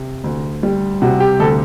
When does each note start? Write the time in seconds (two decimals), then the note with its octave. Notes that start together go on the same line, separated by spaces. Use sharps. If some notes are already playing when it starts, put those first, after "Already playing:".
Already playing: C3
0.24 D2
0.63 G3
1.02 C3 F#4
1.20 G4
1.39 D2 A4